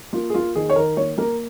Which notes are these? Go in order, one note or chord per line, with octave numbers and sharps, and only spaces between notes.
A#3 F4
G#4
A#3 F4
D#3 G#4
C#5
D#3 A#4
A#3 C#5
A#3 A#4